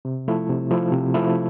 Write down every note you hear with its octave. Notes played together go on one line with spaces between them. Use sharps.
C3
F3 A3 E4
C3
F3 A3 E4
C3
F3 A3 E4